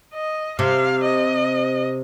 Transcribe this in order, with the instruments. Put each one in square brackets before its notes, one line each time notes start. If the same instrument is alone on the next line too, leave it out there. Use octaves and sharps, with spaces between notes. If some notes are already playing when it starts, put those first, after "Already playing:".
[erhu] D#5
[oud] C3 [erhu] F5
[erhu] D#5